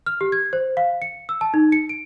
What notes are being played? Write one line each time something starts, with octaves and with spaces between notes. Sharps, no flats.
F6
G4
G#6
C5
F5
C#7
E6
A5
D#4
C#7
D7